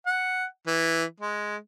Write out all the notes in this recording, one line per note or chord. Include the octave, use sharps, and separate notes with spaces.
F#5
E3
G#3